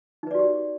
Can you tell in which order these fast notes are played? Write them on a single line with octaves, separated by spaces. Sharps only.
D#4 B4 D5 F#4 G4